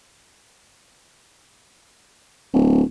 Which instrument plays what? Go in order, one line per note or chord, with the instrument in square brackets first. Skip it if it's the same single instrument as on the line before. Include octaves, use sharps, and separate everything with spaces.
[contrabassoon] D1